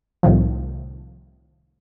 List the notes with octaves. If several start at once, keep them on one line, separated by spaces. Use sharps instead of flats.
C2 A2 D#3 F3